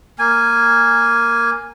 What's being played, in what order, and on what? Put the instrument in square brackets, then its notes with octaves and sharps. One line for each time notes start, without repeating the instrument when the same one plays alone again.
[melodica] A#3 G#5